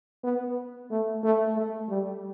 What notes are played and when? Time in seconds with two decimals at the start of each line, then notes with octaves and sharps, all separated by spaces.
0.24 B3
0.91 A3
1.23 A3
1.56 A3
1.89 G3